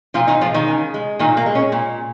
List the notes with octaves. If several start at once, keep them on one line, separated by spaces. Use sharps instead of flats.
A#2 F3 F4
D#3 D#4
F3 G#3 F4
D#3 D#4
C#3
G#3
A#2 D#3 D#4
A#3
G#3
C#4
A#2